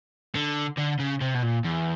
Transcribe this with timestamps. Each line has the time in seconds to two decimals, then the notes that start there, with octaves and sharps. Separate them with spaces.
0.35 D3
0.78 D3
1.00 C#3
1.22 C3
1.35 B2
1.43 A#2
1.65 E2